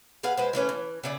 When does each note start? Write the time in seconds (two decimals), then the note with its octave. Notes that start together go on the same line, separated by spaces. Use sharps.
0.23 G#4 B4 F5 F#5
0.37 G#3 B4 C5
0.53 E3 A3 C#4 B4
0.69 E3
1.04 C#3 E4 D5